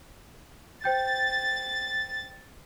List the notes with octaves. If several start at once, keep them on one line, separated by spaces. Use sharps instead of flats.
C5 G5 G6 A6